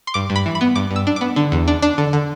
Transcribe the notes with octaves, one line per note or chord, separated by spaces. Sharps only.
C6
G2 D6
G2
B5
E3
B5
B3
G2 D6
G2
E6
D4
B3 D6
D3
E2
D4
D4
D3
D3